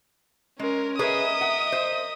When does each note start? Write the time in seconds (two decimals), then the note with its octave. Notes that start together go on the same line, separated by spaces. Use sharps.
0.59 G#3 C#4 A#4
0.99 C#4 G#4 A#4 B4 D#5 E5 D#6
1.41 F#5
1.72 C5